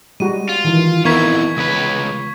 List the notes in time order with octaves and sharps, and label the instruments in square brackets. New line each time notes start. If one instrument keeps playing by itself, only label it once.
[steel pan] G3 G#3 F#4 [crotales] D#7
[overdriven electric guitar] F4
[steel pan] D#3 E3
[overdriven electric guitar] F2 E3 [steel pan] B3 D#4 A#4 [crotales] C#6 G#6 B6
[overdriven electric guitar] C#2 B4